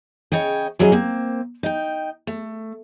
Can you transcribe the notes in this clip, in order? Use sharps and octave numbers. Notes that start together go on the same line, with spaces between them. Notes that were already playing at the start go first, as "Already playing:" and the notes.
C#3 C#5 D#5 G5
E3 F#3 C#4 G#4 D#5
A#3 C4
D#4 G5
A3